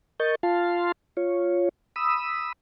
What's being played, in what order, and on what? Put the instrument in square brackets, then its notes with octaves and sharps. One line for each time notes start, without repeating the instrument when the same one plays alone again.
[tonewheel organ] A#4 D#5 C#6 G6 A6
F4 F5 A5 C6
F4 C#5
B5 D#6 E6